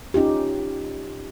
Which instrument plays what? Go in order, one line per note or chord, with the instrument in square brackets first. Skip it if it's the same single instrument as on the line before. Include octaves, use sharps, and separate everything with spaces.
[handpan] C#4 D#4 F4 G4